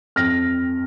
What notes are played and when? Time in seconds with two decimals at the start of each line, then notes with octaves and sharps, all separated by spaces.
0.16 F2 F6 A#6